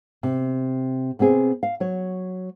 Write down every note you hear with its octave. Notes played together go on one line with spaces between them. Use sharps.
C3
C3 B3 C4 G#4
F5
F#3 C#5